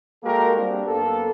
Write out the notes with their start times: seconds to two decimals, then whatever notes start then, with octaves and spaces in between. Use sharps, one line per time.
0.24 G#3 A#3 F#4 G4 A4 A#4
0.56 G3 A#3 C4 D4 G4
0.87 F#2 A#3 B3 A4